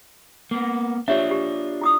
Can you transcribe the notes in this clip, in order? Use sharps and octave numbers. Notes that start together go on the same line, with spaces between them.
A#3 B3
D4 F4 G4 C#5 E5
G4
E4 D6 D#6